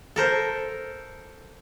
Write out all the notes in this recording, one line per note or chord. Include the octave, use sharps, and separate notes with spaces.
A4 A#4 C5